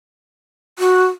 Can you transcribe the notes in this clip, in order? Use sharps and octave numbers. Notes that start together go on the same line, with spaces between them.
F#4